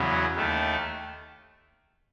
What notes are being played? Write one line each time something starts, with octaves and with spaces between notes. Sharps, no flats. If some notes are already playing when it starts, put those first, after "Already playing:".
Already playing: E2 C#3 F#3 B3
D#2 D#3 A3